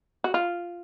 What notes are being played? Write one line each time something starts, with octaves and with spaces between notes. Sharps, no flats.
F#4
F4